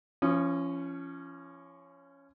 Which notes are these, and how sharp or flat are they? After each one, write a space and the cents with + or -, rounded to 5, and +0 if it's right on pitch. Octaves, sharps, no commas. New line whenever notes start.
F3 -35 C#4 +0 D#6 -20